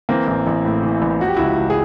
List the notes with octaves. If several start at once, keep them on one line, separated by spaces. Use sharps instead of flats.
E3 A#3 C4
A1
A1
A2
E3
A1
F3 F#4
G4
C#2 E4 F#4
C#2
G#4